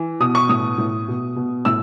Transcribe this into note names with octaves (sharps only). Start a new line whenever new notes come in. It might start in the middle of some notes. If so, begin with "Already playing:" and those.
Already playing: E3
B2 D#6
C#6
A2 D#6
A2
B2
B2
A2 E6